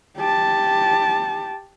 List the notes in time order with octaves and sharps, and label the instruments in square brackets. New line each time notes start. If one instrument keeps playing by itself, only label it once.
[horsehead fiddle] G4 A5